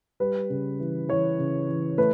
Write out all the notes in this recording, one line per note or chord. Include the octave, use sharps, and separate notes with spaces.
G3 B4
C#3
E3
E3 C#5
C#3
E3
A3 B4